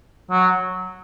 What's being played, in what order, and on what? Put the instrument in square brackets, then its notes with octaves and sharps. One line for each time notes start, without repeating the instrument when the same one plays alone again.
[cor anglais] F#3